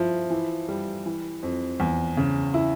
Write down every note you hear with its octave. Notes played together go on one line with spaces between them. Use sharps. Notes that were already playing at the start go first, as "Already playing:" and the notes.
Already playing: F3 E4
E3
G3
E3
F2
E2
C#3
E4